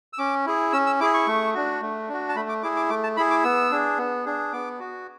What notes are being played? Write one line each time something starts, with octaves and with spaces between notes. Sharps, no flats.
E6
C#4 D6
E4 G#4
C#4 E6
E6
E4 G#4 D6
C#6
A3
D4 F#4
A3
D4 F#4
A5
A3 B5
D6
E4 G#4 D6
D6
A3 D6
A5
E4 G#4 B5
D6
B3 E6
D4 G#4
B3
D4 G#4
B3 D6
F#4